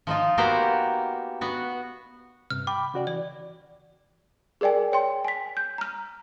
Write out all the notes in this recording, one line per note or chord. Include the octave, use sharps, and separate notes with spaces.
F3 D#4 F4
A#3 B3 F#4 G4 A#4 C5
B3 F#4
G2 C3 F6
G5 B5 D6
C#3 F#4 D5
E3 D5
G#4 A#4 D5 G5 G#5
C#5 G5 C6
G#5 B6
G6
A#5 F6